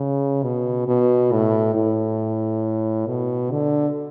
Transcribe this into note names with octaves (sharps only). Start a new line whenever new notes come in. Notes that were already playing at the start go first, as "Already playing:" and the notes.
Already playing: C#3
B2
B2
A2
A2
B2
D3